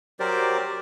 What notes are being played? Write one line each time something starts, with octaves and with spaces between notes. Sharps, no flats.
F#3 G4 A#4 C5 D5